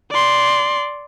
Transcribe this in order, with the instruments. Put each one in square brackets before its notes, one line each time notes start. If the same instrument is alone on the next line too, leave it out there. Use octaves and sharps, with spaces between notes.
[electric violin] D5 C6